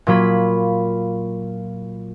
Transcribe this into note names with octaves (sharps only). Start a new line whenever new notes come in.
A#2 F#3 F4 B5